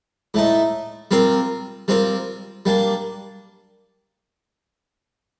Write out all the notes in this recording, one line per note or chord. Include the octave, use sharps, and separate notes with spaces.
A2 A3 D#4
G3 C4 F4 A#4
G3 C4 F4 A#4
G3 A#3 D4